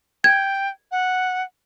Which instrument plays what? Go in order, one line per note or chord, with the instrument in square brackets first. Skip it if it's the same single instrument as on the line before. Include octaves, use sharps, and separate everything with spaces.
[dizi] G5 [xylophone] G#6
[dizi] F#5